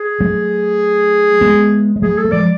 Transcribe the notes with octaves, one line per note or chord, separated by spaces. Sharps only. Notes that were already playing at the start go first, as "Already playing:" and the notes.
Already playing: G#4
F#3 A3
G#3 B3
G#3
F#3 A3 G#4
A4
A3
F3 G#3 D5